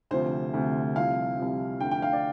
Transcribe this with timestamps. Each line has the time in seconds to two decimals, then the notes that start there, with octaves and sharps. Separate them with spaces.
0.11 D2 C3 F3 C5
0.54 D2 C3 F3
0.96 C2 C3 F3 F5
1.38 C2 C3 F3
1.81 D2 D3 F3 G5
1.91 G5
2.02 F5
2.13 D5